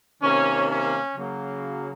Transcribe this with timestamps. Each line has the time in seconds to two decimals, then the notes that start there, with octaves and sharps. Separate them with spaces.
0.22 C3 D#3 A#3 C#4
0.69 C#4
1.16 C#3 F#3 A#3